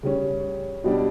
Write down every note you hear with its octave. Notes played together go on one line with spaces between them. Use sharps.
C#3 G3 C#4
B2 G3 D4